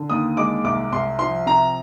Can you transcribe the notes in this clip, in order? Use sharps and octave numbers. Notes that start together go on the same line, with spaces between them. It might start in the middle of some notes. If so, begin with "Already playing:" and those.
Already playing: D3
D#2 D#6
G#3 D6
C2 D6
C2 C6
F3 C6
C3 A#5